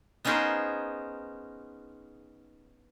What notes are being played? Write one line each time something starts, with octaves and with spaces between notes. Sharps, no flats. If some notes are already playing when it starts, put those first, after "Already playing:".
B3 C#4 D#4 G#4 A#4 C5